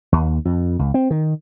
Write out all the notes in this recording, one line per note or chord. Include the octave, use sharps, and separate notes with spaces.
D#2
F2
C#2
C4
D#3